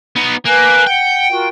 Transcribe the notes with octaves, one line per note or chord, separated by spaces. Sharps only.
B3 D#4
A#3 B4 G#5 F#6
F#5 G5
F4 F#4 A#4